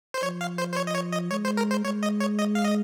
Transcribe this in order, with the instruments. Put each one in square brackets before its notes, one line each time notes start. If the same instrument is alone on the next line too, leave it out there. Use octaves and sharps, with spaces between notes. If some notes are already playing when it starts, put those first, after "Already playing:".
[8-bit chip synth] C5
[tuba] F3 [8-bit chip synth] C#5
[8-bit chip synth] F5
C5
C5
C#5
D#5
C#5
D#5
[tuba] G#3 [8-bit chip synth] C#5
[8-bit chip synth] C5
A#4
C5
[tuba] G#3 [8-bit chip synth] C#5
[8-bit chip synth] D#5
C#5
D#5
F5
D#5